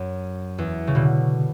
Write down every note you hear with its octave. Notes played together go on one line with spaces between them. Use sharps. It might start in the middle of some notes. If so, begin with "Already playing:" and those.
Already playing: F#2
E2
C#3
B2 D3